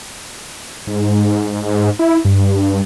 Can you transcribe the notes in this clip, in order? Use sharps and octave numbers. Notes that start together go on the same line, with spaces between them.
G#2
E4
G2